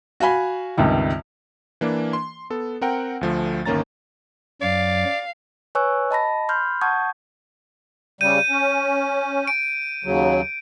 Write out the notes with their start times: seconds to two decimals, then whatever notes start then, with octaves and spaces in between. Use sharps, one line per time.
0.20 F#4 F5 G#5 B5
0.77 C#2 G2 C3 D#3
1.81 E3 A#3 D4
2.13 C6
2.50 B3 A4
2.81 C4 A#4 F#5 G5
3.21 D2 F3 A3
3.66 G1 D#3 A#3 C#4 A#5 A6
4.61 F#2 F#3 D5 F5
5.75 B4 C#5 G#5 C#6 E6 F#6
6.11 D#5 A5 B5 A#6
6.49 B5 C6 F6 G6
6.81 F#5 A5 C#6 D#6 G6 G#6
8.21 C#3 G3 G6 D#7
8.50 C#4
9.47 D7
10.04 D#2 C#3 F#3